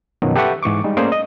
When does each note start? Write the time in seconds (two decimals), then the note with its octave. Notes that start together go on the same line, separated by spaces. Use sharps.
0.22 F#2 B2 D#3 F3 F#3
0.36 G4 A4 B4 E5 F#5 C#6
0.63 G#2 E3 C#6 D6
0.84 G3 G#3 D#4
0.97 A3 A#3 C#4 G#4 C5 D5
1.12 D#5